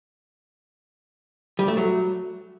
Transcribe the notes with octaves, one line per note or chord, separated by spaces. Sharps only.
G3
A3
F#3